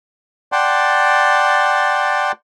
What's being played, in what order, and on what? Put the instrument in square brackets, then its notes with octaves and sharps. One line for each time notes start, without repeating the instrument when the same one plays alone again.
[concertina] D5 F#5 G5 A5 C6